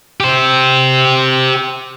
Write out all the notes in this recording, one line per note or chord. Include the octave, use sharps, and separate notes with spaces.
G4 C5